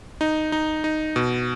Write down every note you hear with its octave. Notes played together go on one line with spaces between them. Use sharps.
D#4
D#4
D#4
B2